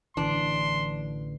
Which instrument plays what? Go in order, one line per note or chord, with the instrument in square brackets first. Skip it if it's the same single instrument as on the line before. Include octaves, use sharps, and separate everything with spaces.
[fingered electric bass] A1 D3 E3 [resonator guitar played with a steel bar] D4 [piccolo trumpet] C6